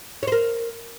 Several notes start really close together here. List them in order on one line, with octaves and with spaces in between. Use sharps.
C#5 C5 A#4